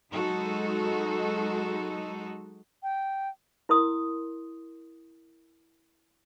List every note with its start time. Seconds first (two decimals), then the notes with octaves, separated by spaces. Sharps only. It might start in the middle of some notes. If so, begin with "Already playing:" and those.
0.11 F#3 G#3 D#4 F#4 A4
2.83 G5
3.69 E4 A#4 C6 D#6